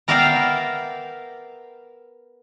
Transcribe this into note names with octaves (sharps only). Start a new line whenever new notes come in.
B3 A#4 D5 E5 F5 G5